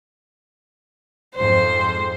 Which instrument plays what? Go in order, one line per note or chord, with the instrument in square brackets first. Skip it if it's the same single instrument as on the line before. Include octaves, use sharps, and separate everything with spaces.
[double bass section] F2 G#2 [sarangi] C5